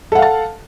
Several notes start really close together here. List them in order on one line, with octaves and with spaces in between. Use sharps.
A4 F#5 F5 A5